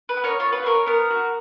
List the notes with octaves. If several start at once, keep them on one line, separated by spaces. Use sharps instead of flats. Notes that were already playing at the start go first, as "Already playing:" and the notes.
B4
B3
A#4 C#5
F4 C#5
B4
G#4
A#4 C#5
B3 A#4
F#4